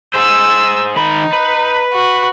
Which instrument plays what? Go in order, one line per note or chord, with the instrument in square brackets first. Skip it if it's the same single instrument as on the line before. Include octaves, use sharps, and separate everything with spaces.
[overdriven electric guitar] G#4 C5 [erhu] E6
[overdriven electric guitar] D#3 B5 [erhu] D#4
[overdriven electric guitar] B4
[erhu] F#4